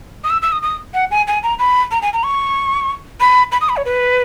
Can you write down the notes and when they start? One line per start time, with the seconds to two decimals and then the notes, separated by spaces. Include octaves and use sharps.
0.24 D#6
0.30 E6
0.42 E6
0.52 D#6
0.62 D#6
0.94 F#5
1.11 G#5
1.27 G#5
1.43 A#5
1.59 B5
1.91 A#5
2.02 G#5
2.13 A#5
2.24 C#6
3.20 B5
3.52 B5
3.61 D#6
3.69 B5
3.77 C#5
3.85 B4